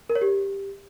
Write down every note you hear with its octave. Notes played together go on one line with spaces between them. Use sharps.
A#4
C#5
G4